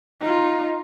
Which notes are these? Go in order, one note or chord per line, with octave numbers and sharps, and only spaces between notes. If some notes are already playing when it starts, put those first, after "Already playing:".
D#4 F4